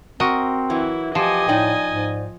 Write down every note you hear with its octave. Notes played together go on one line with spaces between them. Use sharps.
C4 F#4 A#4 D#5
E3 F#3 E4
F3 G4 D#5 G#5
A2 D#4 D5 G5
G#2